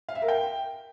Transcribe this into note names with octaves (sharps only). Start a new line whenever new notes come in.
F5
E5
A#4
G5